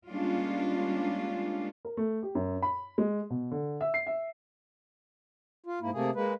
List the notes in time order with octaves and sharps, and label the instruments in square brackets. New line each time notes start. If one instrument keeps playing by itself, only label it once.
[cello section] G3 G#3 A#3 C#4 D4 F4
[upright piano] A#4
A3
G4
F#2
B5
G#3
B2
D3
E5
C7
E5
[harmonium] F4
G#2 A#3 E4
C3 A3 A#3 G#4
G#3 A#3 B4